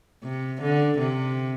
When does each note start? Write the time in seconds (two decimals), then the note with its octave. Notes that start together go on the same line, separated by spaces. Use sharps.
0.24 C3
0.61 D3
0.98 C3